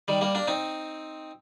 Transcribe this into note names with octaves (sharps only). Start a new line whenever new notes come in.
D#3 G3
G3 A#3
A#3 D4
C4 D#4